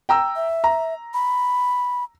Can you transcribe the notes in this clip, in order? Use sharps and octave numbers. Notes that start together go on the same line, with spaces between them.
G5 A#5 E6
E5
A#5
B5